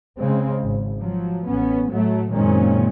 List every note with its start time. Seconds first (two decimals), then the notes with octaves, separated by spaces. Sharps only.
0.19 C#3 G#3 C4
0.64 G#1
0.99 F3 F#3
1.47 A1 B3 C#4
1.89 A2 F#3 A3
2.31 F#1 A#2 D#3 G#3 C4 C#4